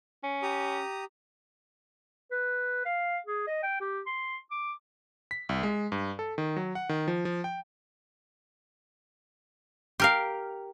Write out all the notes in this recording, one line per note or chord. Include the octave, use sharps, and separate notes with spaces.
C#4
G4 A#5 D#6
B4
F5
G#4
D#5
G5
G4
C6
D6
B6
C2
G#3
G2
A4
D#3
F#3
F#5
D#3
F3
F3
G5
G4 A#4 F5